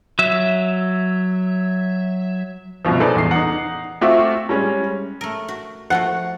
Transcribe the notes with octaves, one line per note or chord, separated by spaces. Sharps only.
F#3 E5
F#1 C2 B2 F3
D#4 G#4 A4 B4 C5 D5
E2 C7
D#4 F#5
A3 C4 F4 F#4 E5 D6
G3 G#3 C#4
A3 A#4
F#4
F3 A3 F#4 F#5